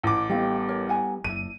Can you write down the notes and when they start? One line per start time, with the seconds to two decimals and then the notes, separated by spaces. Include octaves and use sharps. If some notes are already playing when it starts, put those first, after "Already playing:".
0.03 A1 D6
0.29 G3 A3 B3 G4 D#5 F5
0.69 A#4 C#5
0.89 F#5 G#5 A#5
1.24 F#1 D4 E4 D#7